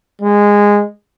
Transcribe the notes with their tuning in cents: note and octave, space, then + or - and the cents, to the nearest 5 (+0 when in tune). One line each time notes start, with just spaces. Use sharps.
G#3 -15